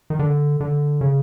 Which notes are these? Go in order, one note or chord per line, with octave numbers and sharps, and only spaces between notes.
D#3
D3
D3
C#3